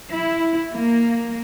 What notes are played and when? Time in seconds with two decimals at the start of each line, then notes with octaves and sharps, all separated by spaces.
0.14 E4
0.74 A#3